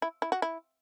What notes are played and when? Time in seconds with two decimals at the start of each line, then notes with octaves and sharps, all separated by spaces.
0.02 E4
0.22 E4
0.32 F#4
0.42 E4